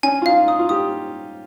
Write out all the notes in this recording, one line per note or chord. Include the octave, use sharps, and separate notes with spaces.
C#4 G#5
F4
D#4 F5
D#4 D#6
F4
G4 D#6